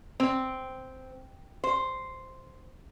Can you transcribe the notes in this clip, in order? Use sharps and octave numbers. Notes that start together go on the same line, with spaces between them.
C4
C5